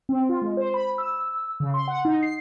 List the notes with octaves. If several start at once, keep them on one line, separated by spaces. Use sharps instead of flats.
C4
F4
G#3
C5
B5
E6
C#3
C6
F#5
D#4
C7